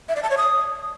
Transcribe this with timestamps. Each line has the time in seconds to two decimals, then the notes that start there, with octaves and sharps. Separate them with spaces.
0.09 E5
0.16 D5
0.23 A5
0.30 C#5
0.37 D#6